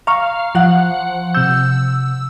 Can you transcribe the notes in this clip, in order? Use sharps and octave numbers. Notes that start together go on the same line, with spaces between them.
F5 A#5 C#6
F3 F#5
C3 E6 G6